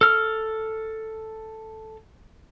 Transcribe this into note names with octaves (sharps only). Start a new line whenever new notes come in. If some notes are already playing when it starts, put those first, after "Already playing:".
A4 F6